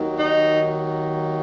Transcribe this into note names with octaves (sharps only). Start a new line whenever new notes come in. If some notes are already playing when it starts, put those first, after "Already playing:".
Already playing: D#2 D#3 F#3
D#4